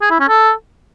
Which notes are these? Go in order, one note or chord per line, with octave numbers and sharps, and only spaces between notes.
G#4
E4
C#4
A4